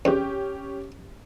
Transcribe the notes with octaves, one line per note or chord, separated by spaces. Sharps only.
E2 C#4 G4